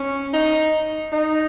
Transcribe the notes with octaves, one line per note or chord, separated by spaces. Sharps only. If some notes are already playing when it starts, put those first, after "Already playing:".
Already playing: C#4
D#4
D#4